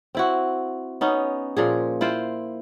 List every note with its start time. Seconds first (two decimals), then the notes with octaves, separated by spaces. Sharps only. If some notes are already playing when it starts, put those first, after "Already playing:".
0.15 C4 E4 F#4
1.01 B3 C#4 D#4
1.57 A#2 F3 G#4
2.01 E4 F4 C5 G5